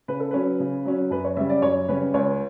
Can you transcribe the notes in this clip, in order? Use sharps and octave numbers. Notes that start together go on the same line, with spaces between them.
C#3 B4
A4
F#3 C#4 B4
C#3
F#3 C#4
F#2 B4
C#5
C#3 G3 C#4 E5
D5
F#2 C#5
C#3 G3 C#4 B4
C#2 C#5